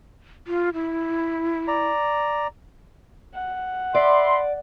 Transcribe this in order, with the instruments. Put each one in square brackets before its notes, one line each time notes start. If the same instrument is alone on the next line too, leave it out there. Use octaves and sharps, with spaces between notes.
[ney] F4
E4
[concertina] D5 A#5
[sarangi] F#5
[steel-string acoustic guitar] D5 [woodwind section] E5 B5 C6